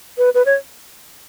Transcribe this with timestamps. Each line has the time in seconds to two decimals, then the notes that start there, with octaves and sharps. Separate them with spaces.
0.18 B4
0.35 B4
0.46 C#5